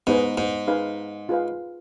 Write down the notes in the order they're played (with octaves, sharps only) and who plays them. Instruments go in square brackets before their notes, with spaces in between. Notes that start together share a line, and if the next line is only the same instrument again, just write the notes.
[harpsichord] G#2 [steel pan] B3 D#4 G#4 B4 D#5
[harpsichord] G#2
[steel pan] D#4 G#4 B4 F5
F4 G#4 B4 F5